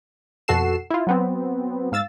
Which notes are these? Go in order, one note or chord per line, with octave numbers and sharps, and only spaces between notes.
F2 B2 F#4 A4 C7 E7
E4 F4
F#3 B3 C4
G#2 F5 E6 A6